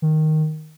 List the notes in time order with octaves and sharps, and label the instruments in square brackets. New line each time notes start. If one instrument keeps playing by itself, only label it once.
[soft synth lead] D#3